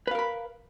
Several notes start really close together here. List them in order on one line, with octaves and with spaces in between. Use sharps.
B4 F5 A#4 B5